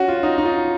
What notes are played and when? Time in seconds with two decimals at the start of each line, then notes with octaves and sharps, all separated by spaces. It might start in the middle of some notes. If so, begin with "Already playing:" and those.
Already playing: C#4 F#4
0.08 F4
0.23 D#4
0.38 D#4
0.45 F4